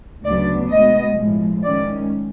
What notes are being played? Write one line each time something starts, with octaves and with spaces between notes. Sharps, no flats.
D2 C#3 F#3 B3 D4 D5
B2 G#3 B3 D#5
A2 F3 G#3
D#3 G#3 C#4 D5